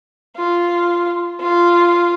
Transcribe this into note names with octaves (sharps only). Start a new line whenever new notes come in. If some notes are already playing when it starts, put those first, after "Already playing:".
F4
F4